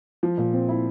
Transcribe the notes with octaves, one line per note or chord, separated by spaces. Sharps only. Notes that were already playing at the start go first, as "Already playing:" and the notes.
F3
A#2
C4
E4